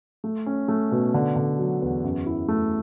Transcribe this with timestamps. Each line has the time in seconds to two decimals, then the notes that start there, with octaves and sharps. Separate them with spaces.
0.24 A3
0.46 C#4
0.68 A3
0.92 B2
1.14 D3
1.36 D3
1.59 F#3
1.82 E2
2.04 F#2
2.26 E4
2.48 A3